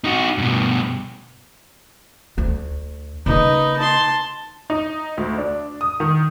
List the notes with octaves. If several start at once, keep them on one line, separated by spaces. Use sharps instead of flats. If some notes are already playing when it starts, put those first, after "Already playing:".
D#4 F#4
G2 B2
D2
C#3 A#3 D#4 B4
A5 C6
D#4
D2
D4
D#6
D#3